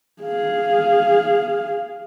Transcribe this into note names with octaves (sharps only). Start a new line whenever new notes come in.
G#4 F5